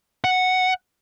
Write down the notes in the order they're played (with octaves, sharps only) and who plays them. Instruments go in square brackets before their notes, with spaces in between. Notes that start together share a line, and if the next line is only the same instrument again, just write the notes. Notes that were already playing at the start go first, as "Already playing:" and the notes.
[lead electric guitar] F#5